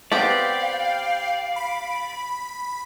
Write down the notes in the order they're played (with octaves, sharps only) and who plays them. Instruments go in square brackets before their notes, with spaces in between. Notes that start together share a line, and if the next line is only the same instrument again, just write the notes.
[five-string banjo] B3 C4 G4 [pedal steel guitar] D5 [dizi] F5 [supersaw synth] G5
[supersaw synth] B5